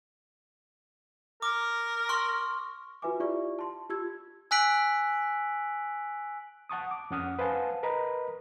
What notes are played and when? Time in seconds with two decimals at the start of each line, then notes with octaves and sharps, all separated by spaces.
1.42 A#4 D6
2.09 C6 C#6 F6
3.02 F4 F#4 B4 E5 G#5 D6
3.20 E4 F4 G4 D5 E5 C#6
3.59 A5 C6
3.90 F4 G4 E6 G#6
4.51 G#5 E6 F#6 B6 D7 F#7
6.69 F#5 A5 C#6 D#6
6.91 D6
7.10 F2 C#4 F#5 D#6 F6
7.39 B4 C5 F5 F#5 G#5 A5
7.83 A#4 B4 D#5 A#5 B5